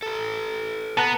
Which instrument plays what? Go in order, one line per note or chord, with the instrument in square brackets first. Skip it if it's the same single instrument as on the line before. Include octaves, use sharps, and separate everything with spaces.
[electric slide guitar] A4 B4
[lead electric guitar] B3 [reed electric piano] A5 A#5 F#6